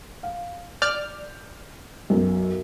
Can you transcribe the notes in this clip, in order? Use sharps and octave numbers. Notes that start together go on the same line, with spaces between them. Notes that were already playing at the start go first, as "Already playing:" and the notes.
F5
D5 F6 G6
B1 F#2